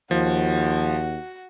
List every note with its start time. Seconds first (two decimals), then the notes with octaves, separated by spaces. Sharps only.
0.11 D#2 F3 F#4